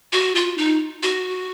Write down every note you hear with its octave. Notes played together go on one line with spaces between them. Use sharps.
F#4
F4
D#4
F#4